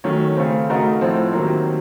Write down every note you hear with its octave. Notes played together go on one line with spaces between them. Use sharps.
D#3 F#3 A3 C#4
C#3 A3 C4
C#3 A3 D#4 F#4 A#4
A2 F3 C4
C3 D#3 F#3 A#3